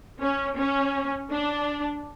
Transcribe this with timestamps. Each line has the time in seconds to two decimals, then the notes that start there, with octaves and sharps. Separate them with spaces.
0.21 C#4
0.58 C#4
1.31 D4